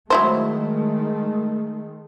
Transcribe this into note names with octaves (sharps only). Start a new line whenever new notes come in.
D#3 F#3 G#3 A3 E4 C5